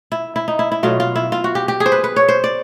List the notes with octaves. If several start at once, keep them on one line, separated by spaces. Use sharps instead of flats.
E4
E4
D#4
E4
E4
B2 F#3 A3 F4
F4
E4
F4
F#4
G4
G4
G#4
C5
B4
B4
C#5
C5
D5